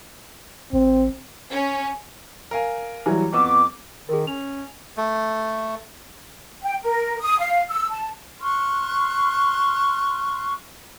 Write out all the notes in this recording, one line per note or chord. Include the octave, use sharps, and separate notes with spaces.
A1 C4
C#4
A#4 F5 G#5
E3 F#3 G3
F2 B3 C#6 D6 E6
D#3 G#4 A#4
C#4 F7
A3
G5
A#4
D#6
F5
E6
A5
C6 C#6 F6 F#6